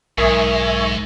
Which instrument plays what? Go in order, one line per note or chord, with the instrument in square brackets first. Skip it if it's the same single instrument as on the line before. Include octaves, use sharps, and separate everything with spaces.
[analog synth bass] B1 [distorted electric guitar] G#2 [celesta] A#4 D#6 [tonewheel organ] E5 G#5 C#6